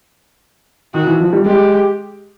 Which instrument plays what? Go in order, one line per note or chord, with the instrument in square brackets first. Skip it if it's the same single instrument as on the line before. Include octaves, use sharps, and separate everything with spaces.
[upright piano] D#3 [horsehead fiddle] F#4
[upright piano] E3
F3
G3
[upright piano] G#3 [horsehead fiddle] G4